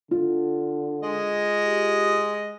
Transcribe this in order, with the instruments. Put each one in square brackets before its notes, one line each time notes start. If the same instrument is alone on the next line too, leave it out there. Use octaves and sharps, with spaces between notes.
[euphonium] D3 [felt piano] F4
[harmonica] G#3 D#5
[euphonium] G4